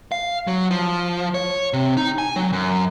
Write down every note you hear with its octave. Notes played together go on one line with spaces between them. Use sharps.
F5
F#3
F3
C#5
C3
D#4
G#5
F#3
F#2